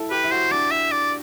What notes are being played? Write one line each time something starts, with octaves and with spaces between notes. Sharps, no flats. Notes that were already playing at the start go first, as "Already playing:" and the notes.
Already playing: E4 A4
G4 B4
E4
F#4 C5
D4 D5
E5
D5